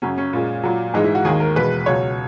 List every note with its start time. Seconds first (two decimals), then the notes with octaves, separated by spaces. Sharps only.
0.02 F#2 C#3 F#3 C#4
0.18 C#4
0.33 A#2 G#3
0.64 A#2 F#3
0.94 G#2 E3 G#3 D#4
1.04 E4
1.15 F#4
1.25 D#2 D#3 G#3 G#4
1.40 A#4
1.56 E2 B2 G#3 B4
1.86 C#2 B2 F#3 C#5